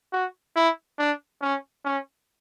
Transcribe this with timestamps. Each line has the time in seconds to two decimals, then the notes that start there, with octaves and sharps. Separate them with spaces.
0.13 F#4
0.56 E4
0.99 D4
1.42 C#4
1.85 C#4